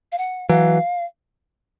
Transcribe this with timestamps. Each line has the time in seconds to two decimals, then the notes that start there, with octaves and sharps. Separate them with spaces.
0.12 F5
0.18 F#5
0.49 E3 F#3 F5